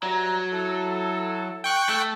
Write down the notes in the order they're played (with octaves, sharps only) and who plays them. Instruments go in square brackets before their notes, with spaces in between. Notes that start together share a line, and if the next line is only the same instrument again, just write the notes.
[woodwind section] G2 E5 A#5 [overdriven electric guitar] F#3
[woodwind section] E4 A4
[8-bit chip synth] G5 C#6 F#6
[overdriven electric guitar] A3 A4